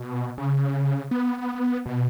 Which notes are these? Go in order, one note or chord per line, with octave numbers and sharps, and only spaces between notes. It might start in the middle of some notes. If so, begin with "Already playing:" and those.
Already playing: B2
C#3
B3
B2